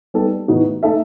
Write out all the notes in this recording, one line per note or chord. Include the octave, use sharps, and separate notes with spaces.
G3 B3 D#4 A4
A2 E3 B3 D#4 F#4
A3 D#4 A4 E5